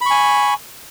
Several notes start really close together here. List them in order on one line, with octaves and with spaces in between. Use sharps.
B5 C#6 G#5